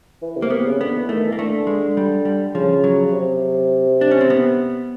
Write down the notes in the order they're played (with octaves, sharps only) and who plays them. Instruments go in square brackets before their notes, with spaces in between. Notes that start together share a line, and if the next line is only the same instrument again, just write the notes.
[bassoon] E3
C3
[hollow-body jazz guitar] A#3
[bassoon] C3 [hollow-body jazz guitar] B3
[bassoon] C#3
[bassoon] D3 [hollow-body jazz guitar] B3
[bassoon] E3
[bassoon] D#3 [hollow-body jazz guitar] A3
[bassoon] E3
[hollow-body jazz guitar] A#3
[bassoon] D3 [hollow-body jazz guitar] A3
[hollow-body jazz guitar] G#3
G3
G3
[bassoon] C#3 [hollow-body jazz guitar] F3
[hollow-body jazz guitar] F#3
[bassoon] C#3
C3
[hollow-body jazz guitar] D4
C#4
C4
B3